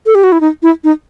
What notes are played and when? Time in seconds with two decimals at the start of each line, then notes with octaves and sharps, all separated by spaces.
0.06 A4
0.15 G4
0.24 F#4
0.32 E4
0.41 D#4
0.63 E4
0.84 D#4